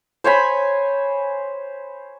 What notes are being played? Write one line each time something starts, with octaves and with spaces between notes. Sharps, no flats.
C5 C#5 G#5 B5